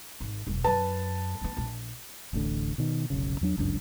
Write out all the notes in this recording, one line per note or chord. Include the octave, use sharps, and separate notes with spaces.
G#1
E1 F#2
F#2 B4 A5
A3 B3
A#1 F4
D1 A1 A2 D3
B2 D#3
F1 B1 C#3
E2 F#3 D4
G1 C#2 F#2 D4